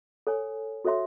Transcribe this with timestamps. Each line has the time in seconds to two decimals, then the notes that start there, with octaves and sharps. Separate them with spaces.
0.27 A4 C#5 G#5
0.85 F#4 A4 C#5 E5 C6